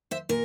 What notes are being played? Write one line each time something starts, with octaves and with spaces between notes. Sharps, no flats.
C5 E5
A#2 A#4